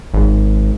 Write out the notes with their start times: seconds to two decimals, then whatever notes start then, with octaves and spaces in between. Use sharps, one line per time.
0.14 G#1